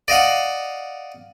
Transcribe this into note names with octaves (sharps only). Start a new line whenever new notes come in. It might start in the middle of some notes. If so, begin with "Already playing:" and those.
D5 D#5 F5 F#5